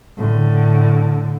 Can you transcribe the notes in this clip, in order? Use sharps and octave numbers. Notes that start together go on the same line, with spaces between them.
A2 D3